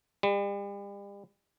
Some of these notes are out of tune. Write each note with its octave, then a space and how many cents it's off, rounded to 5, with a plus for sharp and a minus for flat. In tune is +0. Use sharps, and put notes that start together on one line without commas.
G3 +40